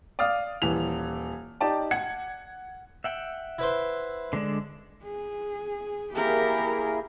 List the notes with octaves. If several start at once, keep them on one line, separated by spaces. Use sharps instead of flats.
D5 F5 D#6 F6
D#1 E3 F7
D#4 G4 D5 A5
F#5 G#6 C#7
E5 F#5 G5
E4 B4 C5
D3 G#3 D4
G#4
A#3 E4 G4 G#4 A#4